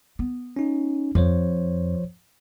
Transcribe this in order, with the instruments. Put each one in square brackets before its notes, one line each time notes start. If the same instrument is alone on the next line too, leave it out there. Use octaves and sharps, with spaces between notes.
[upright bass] B3
[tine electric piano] C#4 D#4
[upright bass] F2 [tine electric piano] F3 C5 C#5